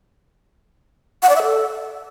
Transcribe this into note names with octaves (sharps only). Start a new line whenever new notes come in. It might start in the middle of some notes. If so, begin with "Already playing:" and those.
F#5
D5
E5
A4